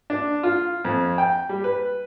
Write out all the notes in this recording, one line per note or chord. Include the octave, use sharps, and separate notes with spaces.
D4
F4
F2
G5
G3
B4